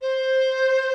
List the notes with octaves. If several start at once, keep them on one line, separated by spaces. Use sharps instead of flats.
C5